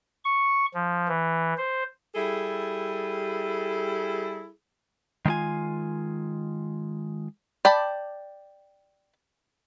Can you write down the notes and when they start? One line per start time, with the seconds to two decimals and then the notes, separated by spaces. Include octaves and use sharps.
0.25 C#6
0.74 F3
1.08 E3
1.57 C5
2.15 G3 E4 G#4 A4
5.26 D#3 G#3 A#3 F4 G#5
7.65 D5 G5 A5 B5